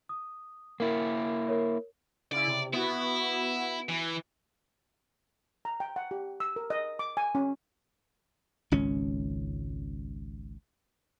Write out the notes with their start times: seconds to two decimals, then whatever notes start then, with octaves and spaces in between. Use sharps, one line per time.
0.09 D#6
0.80 A#3 E4 A#4
1.48 A#4 C#5
2.32 C#3 E4 D5
2.48 C3
2.73 B3 E4 F#4
3.89 E3
5.65 A#5
5.80 G5
5.96 F#5
6.11 G4
6.40 E6
6.56 A#4
6.70 D#5
6.99 D6
7.17 G#5
7.35 C#4
8.72 G#1 C#2 C#4